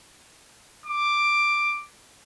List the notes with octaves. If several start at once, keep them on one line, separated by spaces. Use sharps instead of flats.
D6